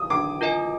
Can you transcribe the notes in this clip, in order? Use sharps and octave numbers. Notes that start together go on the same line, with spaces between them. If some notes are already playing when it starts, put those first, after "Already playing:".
Already playing: D#6
D4 D6
F4 A#4 D#5 G#5